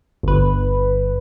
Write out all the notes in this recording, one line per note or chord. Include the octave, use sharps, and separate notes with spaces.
G1 B4